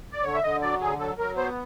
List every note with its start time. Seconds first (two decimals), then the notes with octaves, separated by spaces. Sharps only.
0.13 D5
0.23 D3 C#5
0.34 E5
0.43 D3 D#5
0.61 F#3 D5
0.80 D3 G#4
0.99 F#3 A4
1.18 F#3 A#4
1.36 B3 C5